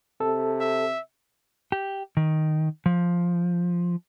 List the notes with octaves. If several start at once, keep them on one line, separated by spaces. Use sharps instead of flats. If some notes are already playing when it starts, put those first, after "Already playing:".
C3 A4
E5
G4
D#3
F3